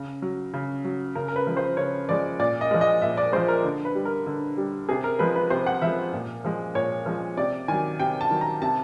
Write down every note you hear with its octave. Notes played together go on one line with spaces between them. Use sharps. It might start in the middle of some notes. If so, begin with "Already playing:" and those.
Already playing: C#3
F#3
C#3
F#3
C#3 A#4
A#4
B4
F3 G#3
C5
C#3 C#5
F3 G#3 D5
A#2 D5
D#5
F3 G#3
D#5
A#2 E5
D5
F3 G#3 C5
A#4
D3
B4
G3
A#4
D3
G3
C3 G#4
A#4
F3 G#3 B4
B4
C3 C5
F#5
F3 G#3 E5
A#2
F3 G#3
A#2 C#5
F3 G#3
C3 D5
D#3 F#3 G#5
C3 G5
A5
D#3 F#3
A#5
C3 A5